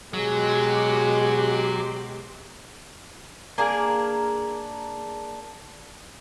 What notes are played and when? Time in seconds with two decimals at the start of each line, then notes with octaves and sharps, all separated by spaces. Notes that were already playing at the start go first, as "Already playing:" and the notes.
0.14 B2 F#3 G#3 G4 G#4 C6 D6
3.58 A#3 D4 G#4 A#4